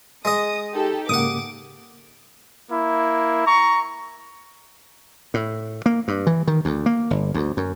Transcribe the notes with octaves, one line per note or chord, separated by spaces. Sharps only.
G#3 D#5 D#6
D#4 G4 A4
G#2 C#3 A#3 F#5 D6 D#6
A#3 E4
A#5 C#6
A2
A#3
G2
E3
D#3
D2
A#3
G1
D2
F#2